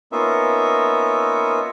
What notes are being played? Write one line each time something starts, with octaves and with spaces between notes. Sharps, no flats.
A#3 B3 C#4 D#4 F4 E5